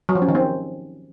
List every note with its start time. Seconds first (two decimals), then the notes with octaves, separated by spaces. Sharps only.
0.09 F#3
0.15 F3
0.22 C#4
0.28 D#3
0.35 C4